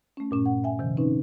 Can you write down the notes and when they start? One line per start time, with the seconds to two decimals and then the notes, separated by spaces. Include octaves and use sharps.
0.17 A3 C#4
0.31 G2 A#2 C#4
0.46 F#5
0.64 E5 G5 G#5
0.79 C3 D#3 F3
0.97 C4 C#4 D#4 B4